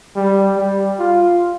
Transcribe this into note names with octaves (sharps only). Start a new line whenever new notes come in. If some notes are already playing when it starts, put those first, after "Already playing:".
G3
G3
F4